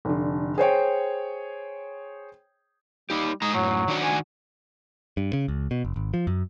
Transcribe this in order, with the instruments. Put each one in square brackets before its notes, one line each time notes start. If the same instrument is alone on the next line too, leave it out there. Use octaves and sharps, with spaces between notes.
[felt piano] F1 D3
G#4 C5 C#5 G5
[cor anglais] G3 [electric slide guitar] D#4 G4
[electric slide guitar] G#3 A#5 [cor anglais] D#4
[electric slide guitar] F#2 A2 [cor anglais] F#3
[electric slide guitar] D#3 D4 F#4
[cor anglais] G#5
[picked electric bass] G2
C#3
C#2
B2
F#1
G#1
F3
F#2